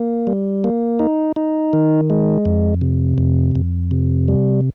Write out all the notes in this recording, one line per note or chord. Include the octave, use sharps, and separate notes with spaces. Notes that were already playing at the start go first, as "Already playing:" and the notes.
Already playing: A#3
G3
A#3
D#4
D#4
D#3
G#3
F2
C3
F2
F2
C3
G3